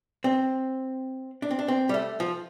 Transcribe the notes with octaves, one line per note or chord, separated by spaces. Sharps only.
C4
D4
C4
D4
C4
G3
A3
F3